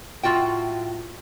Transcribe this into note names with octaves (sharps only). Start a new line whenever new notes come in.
A2 F4 F#4 G5